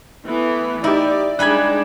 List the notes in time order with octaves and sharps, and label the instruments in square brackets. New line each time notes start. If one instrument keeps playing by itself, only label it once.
[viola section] E3 A3 B3
[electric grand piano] D#4 G4 [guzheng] E4 [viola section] D5
[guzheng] G3 G#5 B5 [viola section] G#3 D#4 [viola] D4 [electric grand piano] F#6 G#6